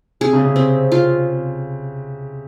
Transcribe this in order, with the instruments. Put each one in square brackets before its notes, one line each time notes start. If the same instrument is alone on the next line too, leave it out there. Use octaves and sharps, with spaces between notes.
[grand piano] C3 [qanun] G#4
[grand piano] C#3
C3
[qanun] C4
F4